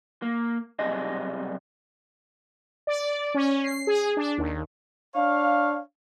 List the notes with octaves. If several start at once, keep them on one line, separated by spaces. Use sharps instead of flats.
A#3
B1 C3 G3 G#4 D#5
D5
C#4
C7
G#4
D4
D#2
D4 C#5 F5